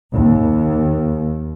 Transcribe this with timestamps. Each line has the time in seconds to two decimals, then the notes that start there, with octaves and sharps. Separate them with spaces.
0.13 D#2